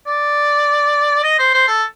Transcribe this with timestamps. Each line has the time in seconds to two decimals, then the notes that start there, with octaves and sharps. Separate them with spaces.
0.06 D5
1.24 D#5
1.39 C5
1.54 C5
1.68 A4